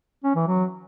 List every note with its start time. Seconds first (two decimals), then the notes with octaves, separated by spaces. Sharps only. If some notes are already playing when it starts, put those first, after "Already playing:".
0.24 C#4
0.36 E3
0.47 F#3